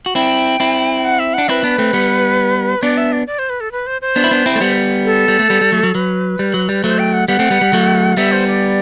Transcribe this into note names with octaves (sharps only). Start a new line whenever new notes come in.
F#4
C4 E4 G5
C4 E4
F#5
E5
D4 F#5
C4 E4 B4
B3 D4
A3 C4
G3 B3
B3 D4 D5
E5
D5
D5
C5
B4
A4
B4
C5
C5
B3 D4
E4
B3 D4
C4 E4
A3
G3 B3
A4
G3
A3
G3 B3
G3
F#3 A3
F#3
F#3 B4
G3
F#3
G3
F#3 A3 C5
G5
F#5
G3 B3 F#5
A3 C4
G3 B3
G3
F#3 A3
G3 B3 E5
C5
D5